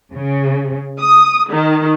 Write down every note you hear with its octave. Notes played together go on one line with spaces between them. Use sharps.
C#3
D#6
D#3